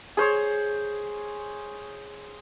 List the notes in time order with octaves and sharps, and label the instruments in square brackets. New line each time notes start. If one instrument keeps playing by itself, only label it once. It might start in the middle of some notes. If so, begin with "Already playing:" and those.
[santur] G#4 C5 C#5